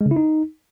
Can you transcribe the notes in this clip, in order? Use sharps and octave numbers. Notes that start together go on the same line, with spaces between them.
G#3
C#3
E4
D#4